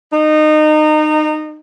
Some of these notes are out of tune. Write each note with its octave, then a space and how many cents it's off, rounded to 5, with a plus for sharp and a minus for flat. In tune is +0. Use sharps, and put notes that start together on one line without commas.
D#4 -25